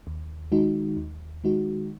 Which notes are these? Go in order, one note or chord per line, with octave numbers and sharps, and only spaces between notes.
D#2
D#3 G#3 D#4 F#4
D#2
D#3 G#3 D#4 F#4